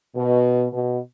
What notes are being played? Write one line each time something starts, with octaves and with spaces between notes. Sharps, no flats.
B2
B2